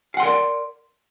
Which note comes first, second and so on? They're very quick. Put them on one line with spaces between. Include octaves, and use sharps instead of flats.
F5 F#5 C6 A#4 D5